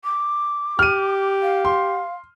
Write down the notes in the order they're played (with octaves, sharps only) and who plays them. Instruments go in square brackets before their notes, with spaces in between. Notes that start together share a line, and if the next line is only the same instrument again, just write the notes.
[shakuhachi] D6
[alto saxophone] G4 [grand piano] F6 D#7
[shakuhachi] F5
[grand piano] C6